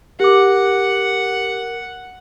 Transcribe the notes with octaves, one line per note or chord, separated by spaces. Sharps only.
G4 A#4 F#5 D6